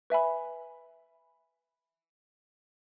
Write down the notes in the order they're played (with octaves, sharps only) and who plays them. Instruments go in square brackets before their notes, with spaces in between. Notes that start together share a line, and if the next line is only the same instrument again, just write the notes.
[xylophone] B4 E5 G#5 B5